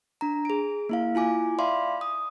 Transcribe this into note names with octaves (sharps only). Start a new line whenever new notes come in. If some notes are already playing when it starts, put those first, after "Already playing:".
D4 A#5
G#4 D7
A#3 E4 F5
E4 F4 G#5 D6
D5 E5 F5 B5 C6 D6
D#6